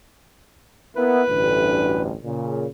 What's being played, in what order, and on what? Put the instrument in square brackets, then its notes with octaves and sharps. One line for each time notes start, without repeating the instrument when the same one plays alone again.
[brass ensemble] A#3 B3 E4 [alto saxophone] B4
[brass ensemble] A1 D2 G2
A#2 C#3